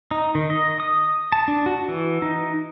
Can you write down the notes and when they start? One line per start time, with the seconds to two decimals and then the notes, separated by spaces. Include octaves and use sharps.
0.11 D#4
0.35 D#3
0.50 D#5
0.80 D#6
1.32 A5
1.48 D4
1.66 F#4
1.88 E3
2.22 D#4